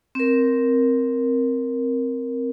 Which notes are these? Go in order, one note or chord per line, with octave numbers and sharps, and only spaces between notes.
C4 A#4